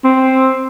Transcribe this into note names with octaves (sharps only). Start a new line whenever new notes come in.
C4